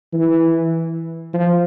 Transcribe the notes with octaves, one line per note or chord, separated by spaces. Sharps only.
E3
F3